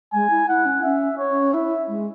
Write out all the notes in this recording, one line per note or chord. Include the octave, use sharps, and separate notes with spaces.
G#3 G#5
E4
E4 F#5
C#4
C#4 E5
C#5
C#4
E4 E5
G#3